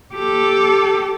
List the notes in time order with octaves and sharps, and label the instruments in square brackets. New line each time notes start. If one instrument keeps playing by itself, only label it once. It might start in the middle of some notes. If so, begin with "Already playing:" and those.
[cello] G4 A4